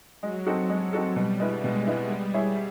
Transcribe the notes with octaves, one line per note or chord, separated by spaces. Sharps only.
F#3 G#3
C4 D#4 F#4 A4
G#3
C4 D#4 F#4 A4
B2 G3
G#3 B3 E4
B2 G#3
G#3 B3 E4
G3 B3
E4 G#4 C#5 E5